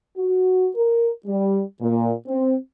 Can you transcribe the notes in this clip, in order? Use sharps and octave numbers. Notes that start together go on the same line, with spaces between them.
F#4
A#4
G3
A#2
C4